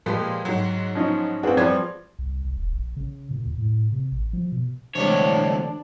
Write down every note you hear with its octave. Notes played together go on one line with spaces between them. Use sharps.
A#2 F3 G#3 G4 B4
G#2 F#3
F3 C#4 D#4
C4 D4 F4 F#4 G#4 B4
F3 G3 D5 G#6
C2
C2
D#1
A#1
C#3
A#2
D#2
A2
C3
A1
F3
B2
D2 C3 E3 G3 G#3 D4 C#5